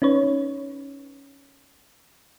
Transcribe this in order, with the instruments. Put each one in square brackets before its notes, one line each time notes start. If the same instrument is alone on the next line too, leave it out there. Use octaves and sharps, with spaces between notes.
[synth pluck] C#4 D#4 B4 C#5